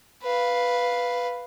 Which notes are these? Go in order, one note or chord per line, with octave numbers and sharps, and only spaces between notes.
B4 F5